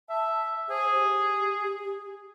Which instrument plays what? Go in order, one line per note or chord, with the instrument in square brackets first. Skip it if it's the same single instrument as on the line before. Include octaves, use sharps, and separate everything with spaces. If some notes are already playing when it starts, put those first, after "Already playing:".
[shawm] E5 [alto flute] A5
[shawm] G#4 [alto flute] C5
[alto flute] G4